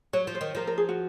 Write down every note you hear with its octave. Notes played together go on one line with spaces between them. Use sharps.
F#3 C#5
F3
C5
D#3
F3 A#4
A#4
G#4
F#4